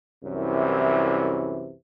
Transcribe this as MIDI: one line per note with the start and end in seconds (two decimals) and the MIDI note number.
0.24 1.73 36
0.24 1.73 42
0.24 1.73 48
0.24 1.73 52